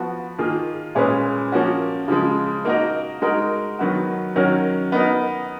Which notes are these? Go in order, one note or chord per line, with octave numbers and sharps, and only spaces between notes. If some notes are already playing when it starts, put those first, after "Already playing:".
Already playing: F3 B3 F#4
D#3 A#3 F4 G#4
A#2 G#3 C#4 G#4 B4
F3 A#3 C#4 F#4
C#3 F3 G#3
A#3 D#4 F#4 A#4 D#5
G#3 D#4 F#4 A#4
D#3 F#3 B3 F#4
D#3 F#3 C#4 F#4 A#4
B3 D#4 A#4 D#5